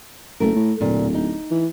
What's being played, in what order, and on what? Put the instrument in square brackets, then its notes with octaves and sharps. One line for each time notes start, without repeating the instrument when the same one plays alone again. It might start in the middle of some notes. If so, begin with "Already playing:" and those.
[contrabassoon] F#1 [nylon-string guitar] A3 A#4
[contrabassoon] A2
[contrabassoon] D1 [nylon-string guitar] A#2
[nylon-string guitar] D#4
[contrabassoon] E3